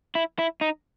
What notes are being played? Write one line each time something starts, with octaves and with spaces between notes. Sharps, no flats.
E4
E4
D#4